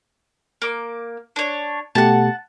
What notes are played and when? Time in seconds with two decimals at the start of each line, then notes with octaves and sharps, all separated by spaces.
0.62 A#3 D6
1.36 D4 C#5
1.95 B2 A3 G4 F#5 A5